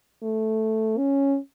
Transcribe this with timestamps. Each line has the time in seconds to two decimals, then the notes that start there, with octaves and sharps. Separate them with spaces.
0.23 A3
0.98 C#4